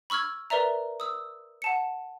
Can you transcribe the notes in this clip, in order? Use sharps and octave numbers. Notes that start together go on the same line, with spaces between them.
B5 C#6 E6 F6 G#6
A#4 B4 D5 E5 A#5
D#6 E6
F#5 A5 C#7